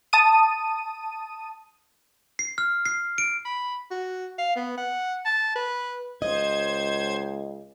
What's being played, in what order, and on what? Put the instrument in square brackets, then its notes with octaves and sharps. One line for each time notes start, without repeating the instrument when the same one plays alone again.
[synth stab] A5 D#6 D#7
[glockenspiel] C7
F6
C7
D7
[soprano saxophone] B5
F#4
F5
B3
F#5
A5
B4
[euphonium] C#2 [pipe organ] C5 G#6 [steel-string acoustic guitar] D#5